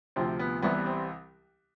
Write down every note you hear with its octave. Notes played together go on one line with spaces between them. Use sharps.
D2 C3 F3 C4
B3
C2 C3 E3 G3 B3
B3
C4